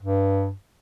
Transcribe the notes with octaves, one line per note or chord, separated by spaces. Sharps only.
G2